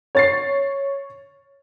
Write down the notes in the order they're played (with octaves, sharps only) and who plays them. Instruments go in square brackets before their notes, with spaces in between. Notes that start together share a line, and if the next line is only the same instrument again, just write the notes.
[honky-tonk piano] C#5 A6 C7